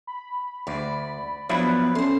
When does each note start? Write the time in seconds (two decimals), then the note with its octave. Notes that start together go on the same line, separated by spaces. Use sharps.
0.07 B5
0.67 D2 D5
1.49 F3 F#3 B3 D4 E4 B4
1.95 C#4 A4 C5 C6